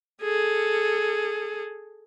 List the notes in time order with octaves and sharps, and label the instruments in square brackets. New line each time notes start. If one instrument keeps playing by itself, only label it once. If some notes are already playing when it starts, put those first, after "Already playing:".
[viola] G#4 A4